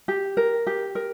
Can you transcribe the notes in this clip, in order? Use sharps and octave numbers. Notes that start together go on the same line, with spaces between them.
G4
A#4
G4
A#4